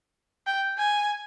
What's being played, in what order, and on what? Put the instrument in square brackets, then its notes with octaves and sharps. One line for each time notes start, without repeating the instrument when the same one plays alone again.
[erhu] G5
G#5